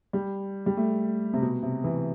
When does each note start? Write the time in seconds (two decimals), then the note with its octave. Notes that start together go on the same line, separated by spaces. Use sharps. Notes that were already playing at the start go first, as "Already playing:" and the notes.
0.13 G3
0.66 G3
0.77 A3
1.33 C3
1.42 B2
1.63 C3
1.84 E3